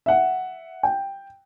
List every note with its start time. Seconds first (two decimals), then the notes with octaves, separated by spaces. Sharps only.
0.06 E5 F#5
0.83 G5